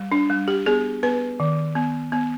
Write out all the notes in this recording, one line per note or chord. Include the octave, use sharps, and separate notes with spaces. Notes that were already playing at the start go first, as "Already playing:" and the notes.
Already playing: G3
D4
G3
G4
B3 G#4
B3 B4
D#3
B3
B3